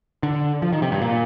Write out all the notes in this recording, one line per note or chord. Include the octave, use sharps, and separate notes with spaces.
D3
F3
D#3
C3
G2
A#2